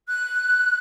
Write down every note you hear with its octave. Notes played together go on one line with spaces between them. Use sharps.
F#6